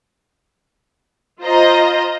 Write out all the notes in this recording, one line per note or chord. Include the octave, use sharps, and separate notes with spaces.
F4 C5 D#5 A#5